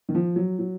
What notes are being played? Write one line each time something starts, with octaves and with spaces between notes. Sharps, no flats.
D#3
F3
F#3
F#3